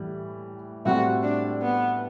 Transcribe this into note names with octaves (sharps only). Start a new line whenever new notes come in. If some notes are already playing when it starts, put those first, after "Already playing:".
Already playing: A2 E3 G3
A2 G3 C4 E4 F#4
D4
B3